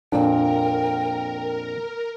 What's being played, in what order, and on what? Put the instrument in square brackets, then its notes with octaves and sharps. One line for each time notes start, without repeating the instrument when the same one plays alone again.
[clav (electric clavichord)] F2 A#2 [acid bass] D4 [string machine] A#4 [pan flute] G5